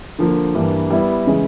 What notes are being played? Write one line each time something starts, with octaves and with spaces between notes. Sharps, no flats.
D3 F3 A#3
G2 E3 G3 A#3
G3 B3 E4
C#3 E3 G#3